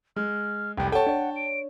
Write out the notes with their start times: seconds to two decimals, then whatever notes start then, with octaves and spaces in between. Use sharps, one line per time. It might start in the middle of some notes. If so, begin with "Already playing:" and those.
0.16 G#3 F6
0.78 F1 C2 G5
0.92 A4 C#5 F#5 G5 A5
1.07 D4 C#5
1.36 D7